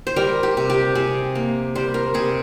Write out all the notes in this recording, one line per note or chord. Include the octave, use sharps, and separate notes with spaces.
C5
G3 A#4
G4
C3
G4
C3 G#4
A#3
G3 C5
A#4
C3 G#4